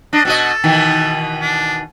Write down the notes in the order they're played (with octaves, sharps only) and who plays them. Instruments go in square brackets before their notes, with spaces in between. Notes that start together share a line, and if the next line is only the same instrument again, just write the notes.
[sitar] D4 [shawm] D#5
[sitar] B2 F#4 D#5 [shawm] A4
[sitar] B2 D#3 E3
[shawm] D4